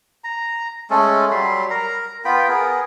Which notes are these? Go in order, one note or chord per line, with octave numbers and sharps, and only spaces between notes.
A#5
G#3 A3 C#4 A4
F#3 G3 B5 C6
A#4 A#5
B3 F4 G5 B5
B3 G#4 A#4